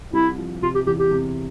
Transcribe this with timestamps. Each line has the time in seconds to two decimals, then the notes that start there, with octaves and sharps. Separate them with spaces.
0.13 C2 E4
0.38 F3
0.62 C3 F4
0.75 G4
0.86 E2 G4
0.99 G4
1.11 C3